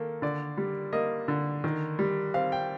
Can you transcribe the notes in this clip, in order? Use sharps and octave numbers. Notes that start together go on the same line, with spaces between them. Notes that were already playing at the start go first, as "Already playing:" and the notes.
Already playing: D#3 A#3 A4
D3 D5
G3
A#3 D#5
D3
D#3
G3
C4 F5
G5